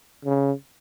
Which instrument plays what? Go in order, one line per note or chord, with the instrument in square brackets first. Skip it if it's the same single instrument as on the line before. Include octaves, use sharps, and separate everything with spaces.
[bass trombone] C#3